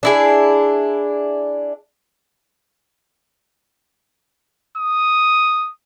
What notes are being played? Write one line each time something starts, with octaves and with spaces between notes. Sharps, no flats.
D4 E4 G#4
D#6